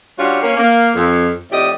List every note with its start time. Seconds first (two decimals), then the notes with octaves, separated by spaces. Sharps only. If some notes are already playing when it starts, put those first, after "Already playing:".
0.18 G3 C#4 D4 F4 F#4
0.43 A#3 C#4
0.57 A#3
0.95 F2
1.52 F2 A2 G4 D5 D#5